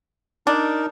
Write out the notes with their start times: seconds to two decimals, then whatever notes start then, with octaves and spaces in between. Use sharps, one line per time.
0.47 D4 D#4 A#4